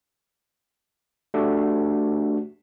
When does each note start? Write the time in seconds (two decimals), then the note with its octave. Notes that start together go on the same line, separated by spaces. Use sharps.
1.34 A3 D4 F#4 G4